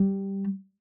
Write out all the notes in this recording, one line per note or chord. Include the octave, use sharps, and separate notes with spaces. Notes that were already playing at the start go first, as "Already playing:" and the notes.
Already playing: G3